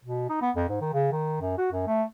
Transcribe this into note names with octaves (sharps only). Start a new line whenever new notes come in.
B2
D#4
B3
F2
G#2
D#3
C#3
D#3
F#2
F#4
F#2
A3